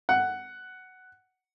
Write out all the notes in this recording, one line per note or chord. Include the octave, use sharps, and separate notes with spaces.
F#5